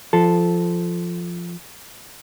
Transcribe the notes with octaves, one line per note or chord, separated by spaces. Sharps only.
F3 A4